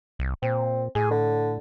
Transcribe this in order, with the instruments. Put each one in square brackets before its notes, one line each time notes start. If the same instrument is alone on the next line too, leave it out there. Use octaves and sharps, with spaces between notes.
[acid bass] C2
[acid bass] A#2 [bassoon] C4
[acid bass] A2 [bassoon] G#4
[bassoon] D3